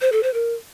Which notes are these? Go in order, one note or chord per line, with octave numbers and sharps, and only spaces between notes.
C5
A4
C5
A#4